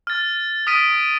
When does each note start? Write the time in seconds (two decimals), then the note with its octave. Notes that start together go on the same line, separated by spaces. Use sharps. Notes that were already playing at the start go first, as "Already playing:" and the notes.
0.07 F6 A6
0.67 D#6 F6 A6 B6 D7 D#7